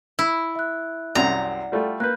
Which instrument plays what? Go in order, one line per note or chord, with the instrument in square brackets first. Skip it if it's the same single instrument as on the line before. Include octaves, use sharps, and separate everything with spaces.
[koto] E4
[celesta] E5 F#6
[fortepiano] C2 F#2 C3 [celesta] D5 F#5 [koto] A#5
[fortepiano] G3 A3 F4
[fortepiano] A#3 B4 [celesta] F#6 G6